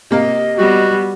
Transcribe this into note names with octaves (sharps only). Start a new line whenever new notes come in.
C3 A#3 D#5
G3 B3 F#4